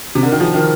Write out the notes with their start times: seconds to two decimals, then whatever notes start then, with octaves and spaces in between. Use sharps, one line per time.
0.15 C3
0.23 D3 A#4
0.32 D#3
0.40 F3 G#4
0.54 D#3 A#4